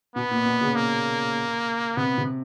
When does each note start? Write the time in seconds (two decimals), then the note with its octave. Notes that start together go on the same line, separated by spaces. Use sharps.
0.16 B2 B3
0.31 A#2
0.45 B2
0.61 C#3
0.76 A#3
1.97 C3 B3
2.18 C3